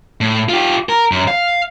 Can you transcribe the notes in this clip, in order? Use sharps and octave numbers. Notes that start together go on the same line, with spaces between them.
A2
F4 G4
A#4
F#2
F5